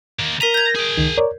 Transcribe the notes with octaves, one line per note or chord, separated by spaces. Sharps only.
D#3 A#3
A#4 A#5 B6 D#7
G6 G#6
G#4 G5
C#2 D#3
A#4 C#5 D5